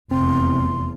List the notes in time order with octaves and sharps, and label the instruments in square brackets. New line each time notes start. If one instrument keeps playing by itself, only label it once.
[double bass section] F1 E2 [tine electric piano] C4 [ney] C6